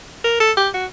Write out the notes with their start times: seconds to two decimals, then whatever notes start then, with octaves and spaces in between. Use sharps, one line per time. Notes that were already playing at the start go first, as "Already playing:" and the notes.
0.24 A#4
0.40 A4
0.57 G4
0.74 F#4